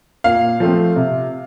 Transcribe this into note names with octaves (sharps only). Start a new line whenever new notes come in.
A#2 F5
F3 A3 C4
C3